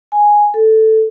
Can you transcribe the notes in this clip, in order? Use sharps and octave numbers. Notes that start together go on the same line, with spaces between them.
G#5
A4